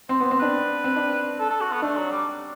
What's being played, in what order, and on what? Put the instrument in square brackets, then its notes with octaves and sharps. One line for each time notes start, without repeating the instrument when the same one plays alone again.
[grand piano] C4 [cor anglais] C5
[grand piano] B3 [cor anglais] C5
[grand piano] C4 [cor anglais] C5
[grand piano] D4 [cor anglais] B4
[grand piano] C4
D4
[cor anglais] A4
A4
F#4
B3
[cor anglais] A3 [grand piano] D4
[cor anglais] F#3
G3